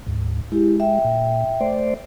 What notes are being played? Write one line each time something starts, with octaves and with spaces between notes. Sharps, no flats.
D2 G#2
G#3 E4 G4
E5 G5
A#2
A3 C5 D5